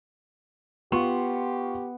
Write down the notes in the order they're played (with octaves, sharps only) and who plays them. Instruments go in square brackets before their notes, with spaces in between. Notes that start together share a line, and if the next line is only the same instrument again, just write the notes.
[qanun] B3 [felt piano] F4 C6 C#6 [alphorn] G4